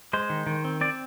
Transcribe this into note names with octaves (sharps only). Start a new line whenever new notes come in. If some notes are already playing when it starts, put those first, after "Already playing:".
G#3 C5
D#3
D#3
C4
C4 D5